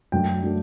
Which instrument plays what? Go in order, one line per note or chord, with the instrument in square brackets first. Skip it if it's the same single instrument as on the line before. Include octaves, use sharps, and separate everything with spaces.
[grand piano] F#2 F#3 A3 D4 G5
F#3 A3 D4